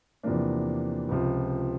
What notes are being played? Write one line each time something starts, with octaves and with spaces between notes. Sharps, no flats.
E2 C3 F3 A#3 D4
C#2 C3 F3